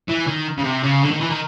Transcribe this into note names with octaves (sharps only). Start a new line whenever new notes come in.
E3
D#3
C#3
C3
C#3
D3
D#3
E3
D#3